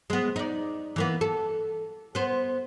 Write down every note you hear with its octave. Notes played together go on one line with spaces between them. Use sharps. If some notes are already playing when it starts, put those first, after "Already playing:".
G#3 B3
D#4 D5
E3 A#3 B3
A4
B3 C5